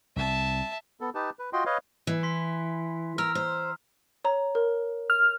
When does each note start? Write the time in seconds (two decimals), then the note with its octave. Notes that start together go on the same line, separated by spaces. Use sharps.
0.16 C2 E5 A5
1.01 B3 A4
1.15 D#4 G4 B4 A5
1.39 B4
1.53 F4 F#4 D#5 G5 C6
1.66 B4 C#5 D#5 F5
2.07 E3
2.23 C6 B6
3.18 A#4 A#5 E6 F6
3.35 C5
4.25 C#5 A#5
4.55 A#4
5.10 F6